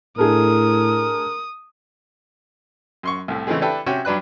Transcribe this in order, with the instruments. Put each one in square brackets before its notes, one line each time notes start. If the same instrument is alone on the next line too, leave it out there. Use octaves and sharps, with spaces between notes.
[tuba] A2 [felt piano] A3 D4 G#4 [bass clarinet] A#4 [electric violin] D#6
[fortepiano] F#2 C6 C#6
C2 A2
C#3 E3 G#3 A3 C4 G#4
D4 E4 G4 A4 B4 G5
C3 C#4 F#4 E5 G5
G2 F#3 D4 B4 F#6